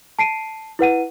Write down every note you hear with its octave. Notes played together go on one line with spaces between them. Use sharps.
A5 C7 D7 D#7
E4 B4 F#5 D#7